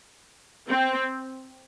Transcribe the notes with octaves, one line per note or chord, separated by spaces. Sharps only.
C4